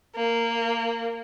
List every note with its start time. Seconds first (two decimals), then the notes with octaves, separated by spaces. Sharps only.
0.16 A#3